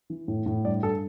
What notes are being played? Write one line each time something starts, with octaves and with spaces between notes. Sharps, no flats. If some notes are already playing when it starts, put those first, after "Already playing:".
E3
A2
A2
G2 D5
G2 A4